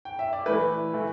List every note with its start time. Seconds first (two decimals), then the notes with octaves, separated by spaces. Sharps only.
0.05 G5
0.19 E5
0.33 D5
0.46 E3 A3 E4 B4
0.93 E3 A3 E4